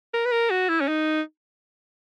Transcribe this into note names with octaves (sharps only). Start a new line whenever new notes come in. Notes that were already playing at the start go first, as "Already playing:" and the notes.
A#4
B4
A#4
F#4
E4
C#4
D#4